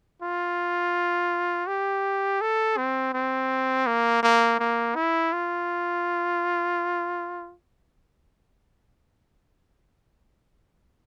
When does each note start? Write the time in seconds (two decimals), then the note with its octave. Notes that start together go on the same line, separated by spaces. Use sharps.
0.22 F4
1.68 G4
2.41 A4
2.77 C4
3.14 C4
3.87 A#3
4.23 A#3
4.59 A#3
4.96 E4
5.33 F4